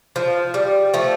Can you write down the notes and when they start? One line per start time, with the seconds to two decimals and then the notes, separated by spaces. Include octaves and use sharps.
0.16 F3
0.54 G3
0.94 F3 A3